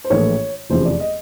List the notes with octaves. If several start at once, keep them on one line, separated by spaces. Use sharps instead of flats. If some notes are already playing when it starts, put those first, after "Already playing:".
C5
A#1 A2 E3 A3 C#5
F1 E2 C#3 F3 C5
D5
D#5